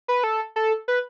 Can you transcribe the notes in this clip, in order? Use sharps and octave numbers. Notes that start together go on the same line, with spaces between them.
B4
A4
A4
B4